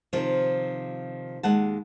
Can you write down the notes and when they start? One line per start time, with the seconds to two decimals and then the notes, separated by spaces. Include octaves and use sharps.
0.13 C3 D#3 F3 F4
1.43 D#2 G#3 F#5 A5